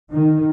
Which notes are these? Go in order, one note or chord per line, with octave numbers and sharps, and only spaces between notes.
D#3